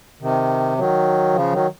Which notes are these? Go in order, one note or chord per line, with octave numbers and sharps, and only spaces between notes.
C3 D#3
D#3 F#3
C#3 F3
D#3 F#3